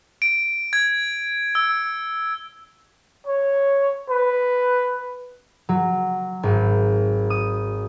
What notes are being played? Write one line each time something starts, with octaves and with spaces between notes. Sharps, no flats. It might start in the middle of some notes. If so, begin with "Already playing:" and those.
D7
G#6
E6
C#5
B4
F#3
G#1
D#6